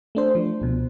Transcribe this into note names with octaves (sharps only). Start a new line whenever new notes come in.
A3 D4 C5
F3
C#2 B2